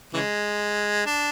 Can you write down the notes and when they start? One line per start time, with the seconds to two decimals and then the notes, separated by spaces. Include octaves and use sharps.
0.13 C#3 E3 G#3
1.06 D4